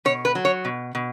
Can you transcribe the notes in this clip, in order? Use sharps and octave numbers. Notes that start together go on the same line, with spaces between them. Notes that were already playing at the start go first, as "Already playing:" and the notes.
B2 C#5
B4
F#3
C#5
B2
B2